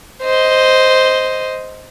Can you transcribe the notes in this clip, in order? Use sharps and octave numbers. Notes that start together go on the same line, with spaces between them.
C5 D#5